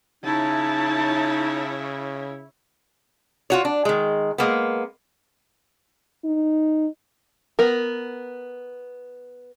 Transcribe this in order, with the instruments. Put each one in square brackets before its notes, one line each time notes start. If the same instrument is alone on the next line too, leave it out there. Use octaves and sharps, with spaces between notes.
[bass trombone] C#3 [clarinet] D#4 [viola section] E4 C#5 [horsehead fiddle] A5
[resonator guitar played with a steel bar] F4 F#4 C#5
D4
D#3 G#3
G#3 A#3 B3
[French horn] D#4
[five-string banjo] B3 A#4